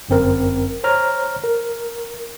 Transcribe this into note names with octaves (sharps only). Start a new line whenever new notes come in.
G1 F#2 C4 A#4
C5 C#5 A#5 F6
A#4